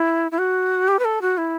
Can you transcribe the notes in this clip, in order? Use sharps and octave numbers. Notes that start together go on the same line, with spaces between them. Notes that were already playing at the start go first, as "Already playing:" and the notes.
Already playing: E4
E4
F#4
G4
B4
A4
F#4
E4